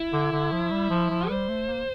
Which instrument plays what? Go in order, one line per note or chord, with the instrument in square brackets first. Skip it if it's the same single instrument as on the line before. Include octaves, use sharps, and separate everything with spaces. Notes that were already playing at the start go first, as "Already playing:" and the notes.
Already playing: [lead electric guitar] E4
[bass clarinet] D3
D3
F3
G3
F3
F3
[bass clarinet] G3 [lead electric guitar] C5
[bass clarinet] A3
A#3